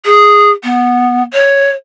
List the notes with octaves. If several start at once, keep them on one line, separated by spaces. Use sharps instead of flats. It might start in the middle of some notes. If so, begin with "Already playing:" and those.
G#4
B3
C#5